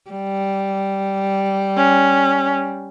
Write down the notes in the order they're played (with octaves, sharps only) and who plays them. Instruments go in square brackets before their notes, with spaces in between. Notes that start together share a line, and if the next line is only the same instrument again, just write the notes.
[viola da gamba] G3
[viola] C#4